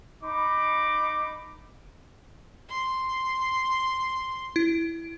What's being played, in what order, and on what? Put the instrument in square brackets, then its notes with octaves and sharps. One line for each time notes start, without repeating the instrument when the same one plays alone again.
[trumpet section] D#4 B5 D6
[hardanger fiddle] C6
[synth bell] E4